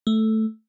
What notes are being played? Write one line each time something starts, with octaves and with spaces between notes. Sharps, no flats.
A3